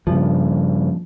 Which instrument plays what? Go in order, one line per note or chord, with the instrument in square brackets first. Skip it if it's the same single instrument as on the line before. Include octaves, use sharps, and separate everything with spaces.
[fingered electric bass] G2 C#3 [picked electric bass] A#2 F3